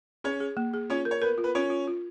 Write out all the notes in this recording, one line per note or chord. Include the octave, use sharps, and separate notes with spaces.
C#4 G#4 C#5
G#4
A#3
G#4
C#4 F4 C#5
A#4
C#5
B3 A#4 B4
F4
B3 B4
C#4 F4 C#5
F4
F4